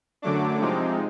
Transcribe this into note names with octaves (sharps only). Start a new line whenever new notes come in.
F#2 D3 F#3 A3 D4 D6
C3 F3 G#3 C4 D#4